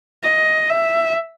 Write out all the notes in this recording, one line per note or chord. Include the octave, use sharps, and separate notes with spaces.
D#5
E5